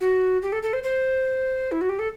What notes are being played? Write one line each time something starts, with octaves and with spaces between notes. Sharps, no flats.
F#4
G4
A4
A4
C5
C5
E4
F#4
G4
A4